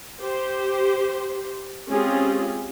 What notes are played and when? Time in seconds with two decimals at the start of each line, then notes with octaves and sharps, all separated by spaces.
0.20 G4 C5
1.88 G#3 C4 C#4 F4 G4 G#4